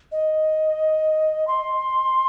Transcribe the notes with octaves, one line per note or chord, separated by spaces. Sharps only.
D#5
C6